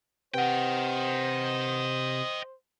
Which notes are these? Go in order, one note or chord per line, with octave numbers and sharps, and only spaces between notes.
C3 B4 C5 D#5 F#5 G5